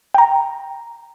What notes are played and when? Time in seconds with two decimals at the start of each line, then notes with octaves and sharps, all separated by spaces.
0.14 G5 A#5